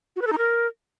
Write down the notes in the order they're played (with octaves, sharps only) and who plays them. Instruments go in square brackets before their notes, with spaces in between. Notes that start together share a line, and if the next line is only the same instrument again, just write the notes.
[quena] F#4
B4
A4
D#4
A#4